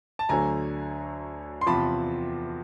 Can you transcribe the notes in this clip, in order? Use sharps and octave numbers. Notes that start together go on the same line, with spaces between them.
A5
D2 D3 F#3 G#5 A#5
C6
E2 C3 F3 A5 B5